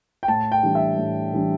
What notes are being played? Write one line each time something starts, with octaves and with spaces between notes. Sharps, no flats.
G5
A2 A5
G5
E3 G3 D4
E5
A2
E3 G3 D4